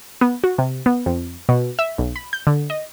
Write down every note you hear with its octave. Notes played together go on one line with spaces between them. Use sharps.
B3
F#4
C3
B3
F2
B2
E5
B1
B5
G6
D3
D#5